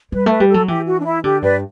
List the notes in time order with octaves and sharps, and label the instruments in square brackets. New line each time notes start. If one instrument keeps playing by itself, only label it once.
[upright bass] G3 [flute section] B4
[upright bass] A3 [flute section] B4
[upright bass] G3
[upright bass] F#3 [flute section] A4
[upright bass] E3 [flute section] G4
[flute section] F#4
D4
E4
[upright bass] D3 [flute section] G4
[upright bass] G2 [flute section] B4 D5